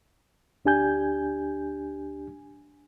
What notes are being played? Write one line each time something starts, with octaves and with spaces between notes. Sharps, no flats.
D2 D4 G4 G#5 G6